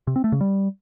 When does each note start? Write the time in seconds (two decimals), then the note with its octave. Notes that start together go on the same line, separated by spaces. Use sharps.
0.07 C3
0.16 C4
0.24 A3
0.32 C#3
0.41 G3